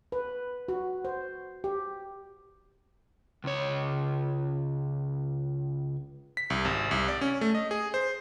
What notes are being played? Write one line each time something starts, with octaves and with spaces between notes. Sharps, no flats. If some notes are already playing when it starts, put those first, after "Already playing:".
B4
F#4
C5
G4
C#2 C#5
B6
C2
G#1
C2
D5
C#4
A3
D#5
G#4
C5